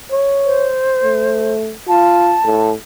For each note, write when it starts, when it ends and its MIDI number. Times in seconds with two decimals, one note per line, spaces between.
0.11 0.69 73
0.46 1.54 72
1.03 1.73 57
1.88 2.37 65
1.88 2.71 81
2.44 2.74 45